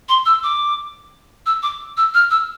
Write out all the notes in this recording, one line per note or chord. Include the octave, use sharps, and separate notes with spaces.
C6
E6
D6
E6
D6
E6
F6
E6